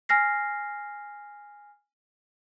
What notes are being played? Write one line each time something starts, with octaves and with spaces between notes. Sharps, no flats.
G#5 F6 A#6 C7